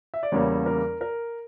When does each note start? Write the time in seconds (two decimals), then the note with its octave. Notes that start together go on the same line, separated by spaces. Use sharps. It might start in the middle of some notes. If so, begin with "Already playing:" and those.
0.14 E5
0.23 D5
0.32 E2 C#3 G3 A#3 C#5
0.66 A#4
1.01 A#4